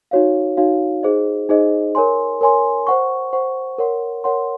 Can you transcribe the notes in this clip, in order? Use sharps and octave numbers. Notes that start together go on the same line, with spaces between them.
D#4 F#4 C#5 F5
D#4 F#4 C#5 F5
D#4 G#4 C5 D#5
D#4 G#4 C5 D#5
A#4 C#5 G#5 C6
A#4 C#5 G#5 C6
C5 F#5 C#6
C5 F#5 C#6
A#4 C#5 F#5 C6
A#4 C#5 F#5 C6